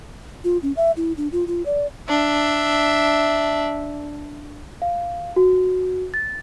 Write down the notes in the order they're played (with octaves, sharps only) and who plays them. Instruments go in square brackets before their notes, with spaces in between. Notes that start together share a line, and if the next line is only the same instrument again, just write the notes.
[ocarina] F4
C#4
E5
E4
D4
F4
F4
D5
[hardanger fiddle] D4 E5
[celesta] F5
F#4
A6